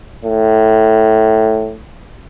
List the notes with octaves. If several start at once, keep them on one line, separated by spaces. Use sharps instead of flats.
A2